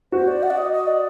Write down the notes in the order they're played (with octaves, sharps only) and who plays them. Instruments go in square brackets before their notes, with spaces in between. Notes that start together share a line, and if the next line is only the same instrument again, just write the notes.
[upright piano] F#4 [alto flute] C5
[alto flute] D5
F#5
D5
D#5
D#5
D5